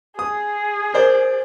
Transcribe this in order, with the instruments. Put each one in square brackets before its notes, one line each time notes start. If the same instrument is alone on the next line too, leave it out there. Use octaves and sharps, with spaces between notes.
[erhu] G#4 [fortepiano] D#6
[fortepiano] A#4 C5 D5